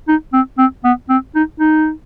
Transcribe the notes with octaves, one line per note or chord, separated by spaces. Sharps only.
D#4
C4
C4
B3
C4
D#4
D#4